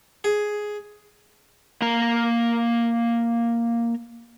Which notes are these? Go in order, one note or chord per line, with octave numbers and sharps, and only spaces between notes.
G#4
A#3 A#5